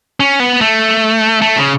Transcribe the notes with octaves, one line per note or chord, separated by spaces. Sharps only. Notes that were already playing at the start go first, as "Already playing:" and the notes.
C#4
B3
A3
A3
C#3